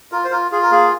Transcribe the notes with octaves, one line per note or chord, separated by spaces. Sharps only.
F4 A#4
C5
F4 A#4
F4 G#4
A#4
A#3 G#4